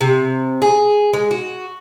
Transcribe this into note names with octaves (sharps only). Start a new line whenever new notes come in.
C3
G#4
G#3
F#4